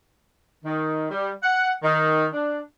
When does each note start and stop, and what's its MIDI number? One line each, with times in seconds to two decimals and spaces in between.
0.64 1.06 51
1.11 1.31 55
1.42 1.72 78
1.83 2.26 51
2.33 2.59 62